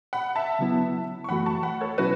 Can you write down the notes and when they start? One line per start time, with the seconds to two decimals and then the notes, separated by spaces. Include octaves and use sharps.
0.13 F#5 B5
0.36 E5 A5
0.59 C#3 F#3 B3 E4
1.24 C#6
1.29 F#2 E3 A3 F#4 F#5 B5
1.46 A5 C#6
1.63 F#5 B5
1.81 A4 C#5
1.98 B2 F#3 C#4 E4 F#4 B4